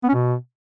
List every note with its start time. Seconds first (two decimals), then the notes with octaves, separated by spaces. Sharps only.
0.04 B3
0.09 C#4
0.14 B2